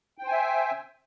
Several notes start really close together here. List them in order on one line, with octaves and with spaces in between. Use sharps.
G5 C5 G#5 E5